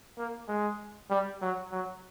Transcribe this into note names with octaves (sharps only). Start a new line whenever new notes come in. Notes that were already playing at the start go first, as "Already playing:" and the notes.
A#3
G#3
G3
F#3
F#3